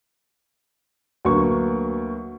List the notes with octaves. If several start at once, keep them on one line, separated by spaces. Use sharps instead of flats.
D2 F#3 A#3 B3 C#6